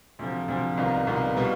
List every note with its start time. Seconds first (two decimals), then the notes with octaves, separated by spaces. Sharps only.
0.19 D2 C3 F3
0.48 D2 C3 F3
0.77 C2 C3 D#3 B3 F4
1.07 C2 C3 D#3 B3 F4
1.37 B2 G3 B3 F4